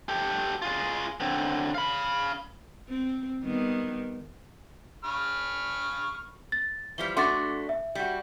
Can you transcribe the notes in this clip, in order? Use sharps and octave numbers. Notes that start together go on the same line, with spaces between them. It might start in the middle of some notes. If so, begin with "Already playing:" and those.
G4 A4
F4 G#4
D3 C4
F5 B5
C4
D#3 G3 B3
B5 C#6 F6
A6
E3 F3 G3 G7
A3 D4 F#4 C6 D6 A6
E5
G3 F#4